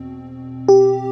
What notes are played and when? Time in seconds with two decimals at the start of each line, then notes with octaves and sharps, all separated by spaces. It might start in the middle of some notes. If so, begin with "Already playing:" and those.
Already playing: E2 B2 C4
0.68 G4